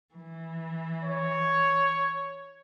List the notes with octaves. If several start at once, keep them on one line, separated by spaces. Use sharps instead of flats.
E3
C#5